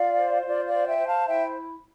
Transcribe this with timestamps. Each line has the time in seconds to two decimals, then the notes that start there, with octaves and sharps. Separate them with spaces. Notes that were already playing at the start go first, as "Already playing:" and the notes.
Already playing: F4 D5 F5
0.17 C5
0.46 F4 D5
0.66 D5 F5
0.73 C5
0.85 E5 G5
0.99 C5
1.06 F5 A5
1.26 E4 E5 G5